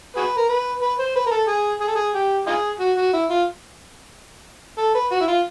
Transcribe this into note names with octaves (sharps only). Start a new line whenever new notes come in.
F#4 G#4 B4
A#4
B4
B4
C5
B4
A#4
A4
G#4
G#4
A4
G#4
G4
D#4 F4 G#4
F#4
F#4
E4
F4
A4
B4
F#4
E4
F4